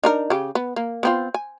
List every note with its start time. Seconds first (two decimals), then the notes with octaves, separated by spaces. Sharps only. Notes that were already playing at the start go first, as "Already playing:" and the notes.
0.04 D4 D#4 A#4
0.30 C#3 G4
0.55 B3
0.76 A#3
1.03 B3 C4 F4
1.34 G#5